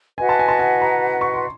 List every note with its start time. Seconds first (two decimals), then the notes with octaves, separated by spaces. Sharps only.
0.18 F#4 B4 D#5 F#5 G#5
0.29 A5
0.39 G#5
0.48 A5
0.59 G#5
0.82 A#5
1.21 C#6
1.34 C6